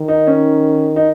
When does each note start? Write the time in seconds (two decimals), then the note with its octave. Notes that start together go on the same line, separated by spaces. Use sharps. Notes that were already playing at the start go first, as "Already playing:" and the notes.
Already playing: D#3
0.08 D#4
0.27 C#4
0.96 D#4